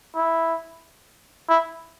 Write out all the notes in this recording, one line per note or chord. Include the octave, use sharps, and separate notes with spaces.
E4
E4